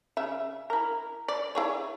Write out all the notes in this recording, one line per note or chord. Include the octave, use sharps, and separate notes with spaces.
C#3 E5
E4 A#4
D5
E4 G#4 C#5